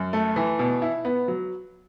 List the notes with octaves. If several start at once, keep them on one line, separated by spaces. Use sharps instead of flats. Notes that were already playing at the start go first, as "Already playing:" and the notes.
Already playing: F#2
A3
E3
B2
E4
B3
F#3